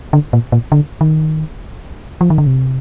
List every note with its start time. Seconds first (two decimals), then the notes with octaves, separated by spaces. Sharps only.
0.13 D3
0.33 A#2
0.52 A#2
0.72 D3
1.01 D#3
2.21 F3
2.30 D#3
2.38 D3
2.47 C3